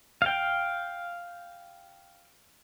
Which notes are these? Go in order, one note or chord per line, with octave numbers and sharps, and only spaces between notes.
F5 G5